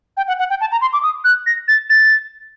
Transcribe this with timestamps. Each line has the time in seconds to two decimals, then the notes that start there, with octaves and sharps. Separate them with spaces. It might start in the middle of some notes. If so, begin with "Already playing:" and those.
0.17 G5
0.28 F#5
0.39 F#5
0.50 G5
0.61 A5
0.72 A#5
0.81 C6
0.93 D6
1.03 D#6
1.24 F#6
1.46 A#6
1.68 A6
1.90 A6